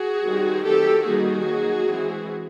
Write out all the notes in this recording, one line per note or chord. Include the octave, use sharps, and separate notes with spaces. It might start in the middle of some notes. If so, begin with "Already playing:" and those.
Already playing: F#4 G#4
D#3 G3 C4 D#4
D#3 F#3 A3 C4 G4 A4
D#3 G3 A#3 D#4 F#4 G#4
F#3 A#3 D#4
E3 G#3 C4